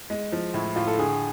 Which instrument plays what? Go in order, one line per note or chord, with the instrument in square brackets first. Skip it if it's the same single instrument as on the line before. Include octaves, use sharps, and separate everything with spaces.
[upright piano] G#3
F3
[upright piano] A2 [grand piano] E4
[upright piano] A2 [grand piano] F4
[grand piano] A4
[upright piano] D3 [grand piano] G#4